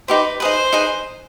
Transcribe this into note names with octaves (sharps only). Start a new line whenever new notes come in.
D#4 G4 B4 C5
D#4 G#4 B4 C5
D#4 G#4 B4